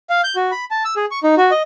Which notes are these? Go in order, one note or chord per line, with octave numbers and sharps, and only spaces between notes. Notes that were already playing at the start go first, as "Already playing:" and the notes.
F5
G6
F#4
B5
A5
E6
G#4
C#6
D#4
F#4
D#5